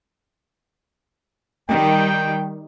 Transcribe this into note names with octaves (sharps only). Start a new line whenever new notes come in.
D#3 G3 G5